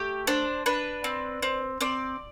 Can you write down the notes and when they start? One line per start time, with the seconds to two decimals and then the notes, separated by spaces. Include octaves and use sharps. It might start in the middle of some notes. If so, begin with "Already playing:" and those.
Already playing: A3 G4
0.27 D4 C5
0.66 D4 B4
1.04 C4
1.42 C4
1.81 C4 D5